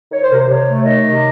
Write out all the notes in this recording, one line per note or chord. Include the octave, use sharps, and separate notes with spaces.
D#3 C#5
C5
C3 A#4
C5
C3 C#5
A3
D#3 D#5
C3